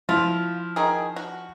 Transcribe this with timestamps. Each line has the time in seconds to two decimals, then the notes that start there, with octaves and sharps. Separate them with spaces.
0.09 F3 E4 F4
0.76 D#3 G#4
1.16 F#4